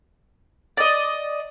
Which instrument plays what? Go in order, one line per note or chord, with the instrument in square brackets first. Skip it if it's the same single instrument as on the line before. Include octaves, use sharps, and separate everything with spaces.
[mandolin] D5 D#5